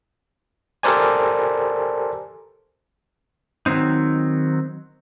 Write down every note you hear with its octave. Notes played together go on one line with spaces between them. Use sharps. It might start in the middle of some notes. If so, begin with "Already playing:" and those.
G4 A4 A#4 C5 D5 G#5
D#3 F#3 C4 D#4